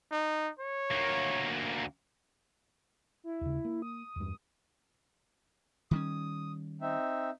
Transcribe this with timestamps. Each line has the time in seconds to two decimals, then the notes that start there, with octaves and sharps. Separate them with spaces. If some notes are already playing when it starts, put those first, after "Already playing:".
0.12 D#4
0.60 C#5
0.91 D2 A#3
3.24 E4
3.41 D#2 C#3
3.65 A#3
3.82 D#6
4.16 E2 G2
5.91 D#3 G3 C#4 D#6
6.81 C4 D#4 E5